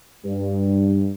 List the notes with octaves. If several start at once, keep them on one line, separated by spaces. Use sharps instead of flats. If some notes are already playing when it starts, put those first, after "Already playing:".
G2